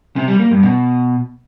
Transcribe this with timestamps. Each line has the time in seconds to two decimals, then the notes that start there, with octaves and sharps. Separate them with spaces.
0.16 C3
0.28 G3
0.40 A#3
0.51 G2
0.63 B2